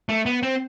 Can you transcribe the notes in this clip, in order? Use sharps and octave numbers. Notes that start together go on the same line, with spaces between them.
A3
B3
C4